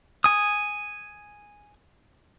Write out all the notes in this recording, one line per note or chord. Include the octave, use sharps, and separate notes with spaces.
G#5 D#6